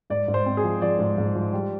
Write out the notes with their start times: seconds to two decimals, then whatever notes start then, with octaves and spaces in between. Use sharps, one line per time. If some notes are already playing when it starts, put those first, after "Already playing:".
0.10 G#2 D5
0.28 G#2
0.34 C5
0.46 C4
0.57 G#4
0.64 F3
0.82 F3 D5
0.99 G#2
1.18 G#2
1.35 F3
1.53 G3